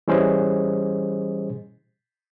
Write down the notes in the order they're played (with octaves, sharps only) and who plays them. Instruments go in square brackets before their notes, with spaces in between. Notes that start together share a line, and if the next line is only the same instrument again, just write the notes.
[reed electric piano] E3 G3 C#4 G#4 C5 D#5